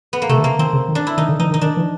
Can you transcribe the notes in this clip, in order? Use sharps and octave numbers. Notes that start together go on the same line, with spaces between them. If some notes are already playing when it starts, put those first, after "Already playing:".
B3
A#3
C3 A3
D3
C#3 A#3
D#3 C4
C#3
D#3
D4
E4
D#3 D#4
D3
E3 D#4
D#3
D#4
D#3 D4
E3